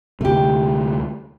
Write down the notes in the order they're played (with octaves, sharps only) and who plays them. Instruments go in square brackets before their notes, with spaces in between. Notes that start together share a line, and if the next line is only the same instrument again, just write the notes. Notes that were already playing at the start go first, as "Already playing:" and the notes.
[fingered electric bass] D2 C3 [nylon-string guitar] A3 G4